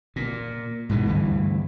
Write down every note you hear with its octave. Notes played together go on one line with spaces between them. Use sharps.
A#2
G#2 B2 D#3 E3
D2 G2 E3